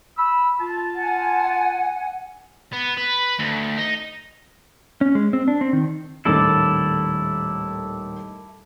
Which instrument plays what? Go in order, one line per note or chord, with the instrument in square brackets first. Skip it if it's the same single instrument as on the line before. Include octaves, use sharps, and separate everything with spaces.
[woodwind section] B5 E6
F4 A5
[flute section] F#5 G#5
[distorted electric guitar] B3
B4
D2
D#4
[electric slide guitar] C#4
G#3
C4
D4
C4
D#3
[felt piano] D#1 A2 D#3 [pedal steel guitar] E4 A4 D5